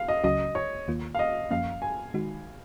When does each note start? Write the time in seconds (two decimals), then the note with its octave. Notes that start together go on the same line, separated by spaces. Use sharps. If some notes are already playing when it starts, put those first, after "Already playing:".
Already playing: F5
0.08 D#5
0.24 C#2 C#3 F#3 C#4 F#4 D#5
0.55 C#5
0.88 D#2 D#3 A#3 F4
1.15 F5
1.19 D#5
1.50 F#2 F3 A#3 C#4 F5
1.82 G#5
2.14 D#3 G#3 D#4 F#4